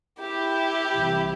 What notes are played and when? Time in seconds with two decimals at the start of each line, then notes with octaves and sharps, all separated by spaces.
0.22 E4 G4
0.93 C2 C3 E3